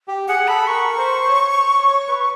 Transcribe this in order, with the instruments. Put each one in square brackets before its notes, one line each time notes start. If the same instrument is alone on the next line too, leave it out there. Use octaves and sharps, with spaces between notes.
[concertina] G4
[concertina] G#4 [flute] F#5
[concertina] G#4
[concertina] A4 [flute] B5
[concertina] A#4 [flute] C#6
[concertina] C5
C5
C#5
C#5
B4